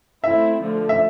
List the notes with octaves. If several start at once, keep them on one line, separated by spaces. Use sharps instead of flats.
A3 C4 E4 E5
D3 F3 A3
E5